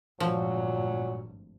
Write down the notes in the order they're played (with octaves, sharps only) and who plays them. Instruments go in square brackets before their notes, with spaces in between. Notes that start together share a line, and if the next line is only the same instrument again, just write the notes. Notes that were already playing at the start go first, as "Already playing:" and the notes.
[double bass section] G#1 D2 G2 [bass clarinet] A#2 [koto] F3 [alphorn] F#3